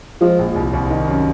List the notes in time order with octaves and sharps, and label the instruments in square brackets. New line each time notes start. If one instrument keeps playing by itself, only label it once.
[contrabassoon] F3 [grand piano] G#3
[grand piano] A#1
C2
C2
D#3
F#2